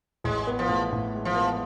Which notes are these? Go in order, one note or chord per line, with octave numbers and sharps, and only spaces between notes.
A1 G#3
B3
F3
A2
A2
G#3
F3
B3